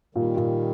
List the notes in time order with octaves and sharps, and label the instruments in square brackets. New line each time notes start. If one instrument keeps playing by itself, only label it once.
[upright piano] A#2 [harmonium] D#3 G3
[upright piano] A#2